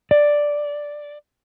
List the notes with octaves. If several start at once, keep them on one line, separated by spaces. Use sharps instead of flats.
D5